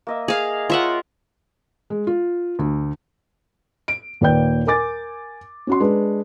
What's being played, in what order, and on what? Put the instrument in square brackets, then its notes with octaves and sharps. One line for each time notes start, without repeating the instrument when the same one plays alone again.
[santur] A#3 D#5 E5
[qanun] G#4 F5
[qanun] F4 E5 F#5 [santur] A#4 C#5 C6
[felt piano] G#3
F4
D2
D7
D#2 A#2 B4 D5 G5 G6
A#4 G#5 D6 A6
C#4 F#4 C6
G#3 D4 B4